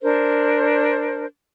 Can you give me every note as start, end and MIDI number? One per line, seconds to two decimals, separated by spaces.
0.02 1.24 62
0.02 1.24 70
0.02 1.24 72